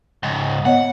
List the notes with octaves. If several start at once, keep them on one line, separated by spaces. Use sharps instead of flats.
C#2 G#2
B3 C#5 D#5 F#5